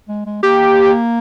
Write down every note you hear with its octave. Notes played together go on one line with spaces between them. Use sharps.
G#3
G#3
A#3 G4